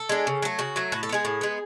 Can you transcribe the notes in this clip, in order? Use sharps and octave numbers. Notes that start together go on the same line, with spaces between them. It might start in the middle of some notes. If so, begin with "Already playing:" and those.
Already playing: A4
G#3 D4
C#3
F#3 A3
C#3 F#4
F#3 A3
A2 F#4
A4
G#3 B3 G#4
A2
G#3 B3